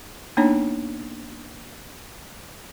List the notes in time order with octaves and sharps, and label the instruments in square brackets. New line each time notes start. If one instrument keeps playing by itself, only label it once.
[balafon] A#3 B3 D4 D#4 C#5 A5